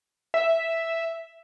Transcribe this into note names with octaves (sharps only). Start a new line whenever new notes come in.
E5